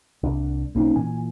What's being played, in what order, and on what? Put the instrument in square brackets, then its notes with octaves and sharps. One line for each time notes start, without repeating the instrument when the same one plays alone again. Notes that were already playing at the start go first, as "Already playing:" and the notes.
[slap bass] C2 D4
[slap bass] B1 C4 [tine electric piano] A#3 C#4 D#4
[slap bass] A#2 E3 [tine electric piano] G#5